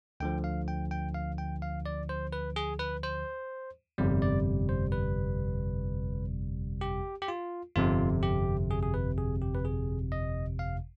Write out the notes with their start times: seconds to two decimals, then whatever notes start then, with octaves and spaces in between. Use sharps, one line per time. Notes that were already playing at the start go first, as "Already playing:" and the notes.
0.20 D2 D3 F3 G5
0.44 F5
0.68 G5
0.91 G5
1.14 F5
1.38 G5
1.62 F5
1.86 D5
2.09 C5
2.33 B4
2.56 G#4
2.79 B4
3.03 C5
3.98 G1 F2 C3 G3
4.22 D5
4.69 C5
4.92 B4
6.81 G4
7.22 G4
7.28 F4
7.76 G1 F2 C3 F4
8.23 G4
8.71 G#4
8.83 G#4
8.94 B4
9.18 G#4
9.42 G4
9.55 B4
9.65 G#4
10.12 D#5
10.59 F5